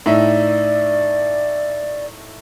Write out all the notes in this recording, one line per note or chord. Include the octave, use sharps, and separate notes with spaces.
A2 D#4 D5 E5